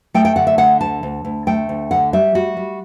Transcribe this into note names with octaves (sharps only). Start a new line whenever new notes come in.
A3 G5
G5
D3 F#5
E5
D3 F#5
D2 A5
D2
D2
A3 G5
D2
D3 F#5
G3 E5
G3 F#4
G3